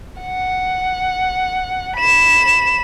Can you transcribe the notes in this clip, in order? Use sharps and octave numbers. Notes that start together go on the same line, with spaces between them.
F#5
B5 E7